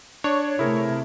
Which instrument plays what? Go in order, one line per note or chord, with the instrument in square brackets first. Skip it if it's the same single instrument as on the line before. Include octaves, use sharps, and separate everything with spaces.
[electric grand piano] D4 [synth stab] C#5
[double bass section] C3 A3 [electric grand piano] E4 G#4 A#4